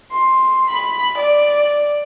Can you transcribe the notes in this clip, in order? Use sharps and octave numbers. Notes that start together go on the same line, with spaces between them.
C6
B5
D5